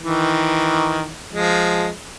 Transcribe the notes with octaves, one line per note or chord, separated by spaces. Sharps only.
D#3 E3
F3 G#3